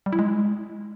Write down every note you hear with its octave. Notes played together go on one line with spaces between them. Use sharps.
G3
E4
G#3